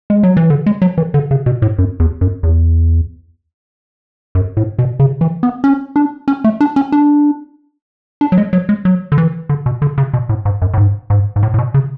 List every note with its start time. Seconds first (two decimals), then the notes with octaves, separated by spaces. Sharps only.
0.10 G#3
0.23 F#3
0.37 E3
0.50 D3
0.66 G#3
0.82 F#3
0.98 E3
1.14 D3
1.31 C#3
1.46 B2
1.62 A2
1.78 F#2
2.00 E2
2.21 F#2
2.43 E2
4.35 F#2
4.57 A2
4.79 B2
5.00 C#3
5.21 E3
5.43 B3
5.64 C#4
5.96 D4
6.28 C#4
6.44 A3
6.61 D4
6.76 C#4
6.92 D4
8.21 D4
8.32 F#3
8.38 G#3
8.53 F#3
8.69 G#3
8.85 F#3
9.12 D3
9.18 E3
9.49 D3
9.66 B2
9.82 D3
9.98 C#3
10.14 B2
10.29 A2
10.45 G#2
10.62 F#2
10.74 A2
10.78 G#2
11.10 G#2
11.36 G#2
11.43 A2
11.54 A2
11.58 B2
11.74 C#3